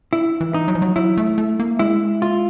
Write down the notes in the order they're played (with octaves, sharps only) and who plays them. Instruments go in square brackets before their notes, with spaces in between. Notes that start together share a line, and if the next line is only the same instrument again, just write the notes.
[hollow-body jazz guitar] E4
[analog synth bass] E3
[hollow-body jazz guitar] D#4
[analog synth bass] F#3
F3
F#3
[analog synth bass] F#3 [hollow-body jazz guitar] E4
[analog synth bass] A3
A3
A#3
[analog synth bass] G#3 [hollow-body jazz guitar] E4
[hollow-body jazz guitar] F4